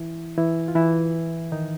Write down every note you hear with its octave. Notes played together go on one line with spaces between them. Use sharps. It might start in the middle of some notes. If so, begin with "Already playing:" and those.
Already playing: E3 E4
E3 E4
F4
E3 E4
D#3 D#4